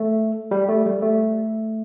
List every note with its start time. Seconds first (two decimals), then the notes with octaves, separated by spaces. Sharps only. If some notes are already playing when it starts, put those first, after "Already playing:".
Already playing: A3
0.51 G3
0.69 A3
0.86 G3
1.02 A3